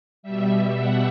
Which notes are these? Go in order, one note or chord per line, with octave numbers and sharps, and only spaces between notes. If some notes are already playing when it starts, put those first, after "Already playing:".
B2 G3 E5
F#5